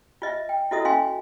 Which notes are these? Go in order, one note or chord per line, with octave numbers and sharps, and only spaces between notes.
F4 D#5 E5
G5
E4 F#4 A4 D#5 E5 D#6
C#4 F5 G5 G#5 C6